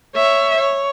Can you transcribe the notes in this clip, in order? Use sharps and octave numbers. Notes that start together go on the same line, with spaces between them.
C#5 E5
C#5